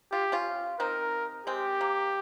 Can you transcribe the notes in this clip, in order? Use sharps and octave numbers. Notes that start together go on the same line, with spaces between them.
F4 G4
C#4 F4
C4 D#4 A#4
G#3 C4 G4
A#3